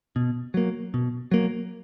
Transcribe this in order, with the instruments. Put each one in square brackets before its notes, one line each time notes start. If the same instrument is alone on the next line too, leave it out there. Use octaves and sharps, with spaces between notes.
[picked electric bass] B2
F#3 A#3
B2
F#3 A#3